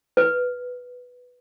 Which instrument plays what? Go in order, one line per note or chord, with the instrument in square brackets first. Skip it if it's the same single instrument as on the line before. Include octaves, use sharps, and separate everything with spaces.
[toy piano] B4